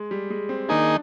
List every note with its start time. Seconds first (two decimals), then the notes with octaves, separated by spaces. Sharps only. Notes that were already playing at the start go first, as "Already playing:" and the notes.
Already playing: G#3
0.11 G3
0.30 G#3
0.49 C4
0.69 D#3 A#3 D4 D#4 G#4